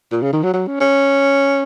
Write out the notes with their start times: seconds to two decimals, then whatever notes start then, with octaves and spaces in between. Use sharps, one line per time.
0.12 A#2
0.22 C#3
0.33 D#3
0.43 F#3
0.53 F#3
0.67 C#4
0.81 C#4